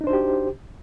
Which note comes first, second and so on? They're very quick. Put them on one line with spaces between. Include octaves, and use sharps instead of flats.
D#4 D4 C5 F#4 G4